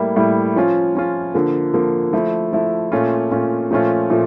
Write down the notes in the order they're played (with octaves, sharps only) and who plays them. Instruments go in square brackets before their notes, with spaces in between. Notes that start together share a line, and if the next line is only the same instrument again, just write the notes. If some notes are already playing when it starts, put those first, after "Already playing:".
Already playing: [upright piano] A2 G3 A#3 E4
A2 G3 A#3 E4
F3 C#4 F4
F3 C#4 F4
D3 F3 A#3
D3 F3 A#3
F3 A3 E4
F3 A3 E4
A#2 A3 C#4 F4
A#2 A3 C#4 F4
A#2 F3 A3 C#4 F4
A#2 F3 A3